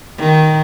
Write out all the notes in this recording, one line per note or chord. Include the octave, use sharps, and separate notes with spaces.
D#3